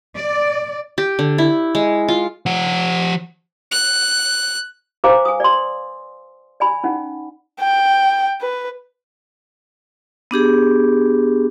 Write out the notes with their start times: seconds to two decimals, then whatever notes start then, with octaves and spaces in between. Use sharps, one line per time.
0.16 D5
0.98 G4
1.19 D3
1.38 E4
1.75 G#3
2.08 F4
2.46 F3 F#5
3.71 F#6
5.04 B4 C5 F5 G#5 A#5 D6
5.25 G#5 D#6
5.40 D5 C6
6.60 D5 G#5 B5
6.84 C#4 D#4 F#5
7.60 G5
8.41 B4
10.31 B3 D4 G4 G#4